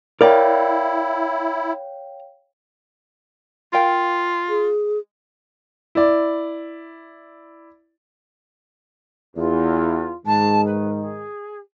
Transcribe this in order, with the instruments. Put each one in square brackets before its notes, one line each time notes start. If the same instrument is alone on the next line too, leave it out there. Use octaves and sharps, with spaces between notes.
[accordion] E4 [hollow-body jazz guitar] A#4 D5 [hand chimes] C#5 F5 G5
[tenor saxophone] F4 [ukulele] A#4 F5 G5
[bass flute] G#4
[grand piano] E4 D5
[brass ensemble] E2 [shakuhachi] F4
[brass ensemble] G#2 D#3 [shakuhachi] A5
[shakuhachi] B4
G#4